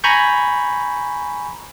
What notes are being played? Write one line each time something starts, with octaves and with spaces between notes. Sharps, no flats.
G#5 A#5 B5 C#6 G6